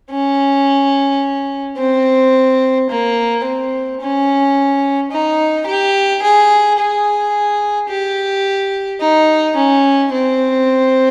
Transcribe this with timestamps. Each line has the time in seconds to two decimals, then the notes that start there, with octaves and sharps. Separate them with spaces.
0.11 C#4
1.77 C4
2.89 A#3
3.44 C4
4.00 C#4
5.11 D#4
5.66 G4
6.22 G#4
6.79 G#4
7.89 G4
9.01 D#4
9.56 C#4
10.12 C4